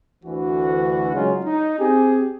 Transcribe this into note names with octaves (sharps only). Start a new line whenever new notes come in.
D2 E3 F#4
C#3 F#3 G#3 C#4 D#4 F4
D#4
C4 G4 G#4